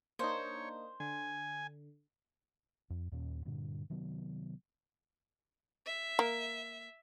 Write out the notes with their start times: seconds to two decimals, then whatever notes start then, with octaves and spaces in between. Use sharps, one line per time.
0.19 A#3 D4 D#4 C5 C#5
1.00 D3 G#5
2.90 F2
3.12 D#2 A#2 C#4
3.45 G2 A#2 D3
3.90 C3 D#3 F#3 B3
5.86 E5
6.19 A#3